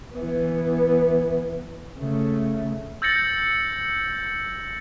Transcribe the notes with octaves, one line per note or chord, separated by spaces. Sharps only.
E3 B3
C#3 A3
E6 G6 A6 A#6 C#7 F#7